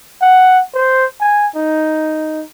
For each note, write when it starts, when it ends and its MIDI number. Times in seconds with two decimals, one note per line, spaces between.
0.21 0.61 78
0.75 1.06 72
1.20 1.47 80
1.56 2.43 63